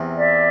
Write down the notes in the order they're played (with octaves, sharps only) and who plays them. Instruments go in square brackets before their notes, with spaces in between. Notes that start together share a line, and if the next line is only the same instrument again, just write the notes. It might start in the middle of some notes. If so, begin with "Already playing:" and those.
Already playing: [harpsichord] E2 C3
[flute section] D5 E5